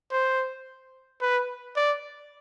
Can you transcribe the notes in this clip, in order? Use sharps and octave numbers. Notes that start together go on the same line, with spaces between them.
C5
B4
D5